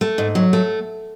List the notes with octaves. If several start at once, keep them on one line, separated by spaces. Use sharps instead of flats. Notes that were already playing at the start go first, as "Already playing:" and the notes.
A3
G#2
F#3
A3